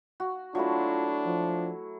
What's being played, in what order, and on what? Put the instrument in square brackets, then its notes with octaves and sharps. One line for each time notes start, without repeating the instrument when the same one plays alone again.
[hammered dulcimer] F#4
[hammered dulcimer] F#3 A3 E4 [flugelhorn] D4 [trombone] F4
[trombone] F3